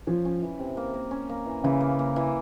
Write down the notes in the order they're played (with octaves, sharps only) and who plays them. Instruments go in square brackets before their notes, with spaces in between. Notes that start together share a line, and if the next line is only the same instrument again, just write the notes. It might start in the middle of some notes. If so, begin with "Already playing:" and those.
[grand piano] F3 [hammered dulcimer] C#4
[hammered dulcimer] C#4
E3
C3
A#3
A#3
C#4
A#3
E3
[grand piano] C#3 [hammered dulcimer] E3
[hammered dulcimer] A#3
A#3
E3